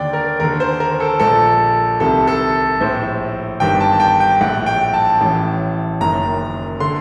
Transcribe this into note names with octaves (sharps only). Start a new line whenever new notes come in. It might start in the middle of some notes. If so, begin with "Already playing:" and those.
Already playing: D#2 D3 D5 G5
A#4
D#2 D3 A#4
C5
A#4
A4
A#1 A#2 A4
C2 C3 D#3 A4
A4
A#1 A2 C5
G1 G2 D#3 G5
A5
G5
G5
A#1 A2 F#5
G5
A5
A1 A2
F#1 F#2 D#3 A#5
D3 C6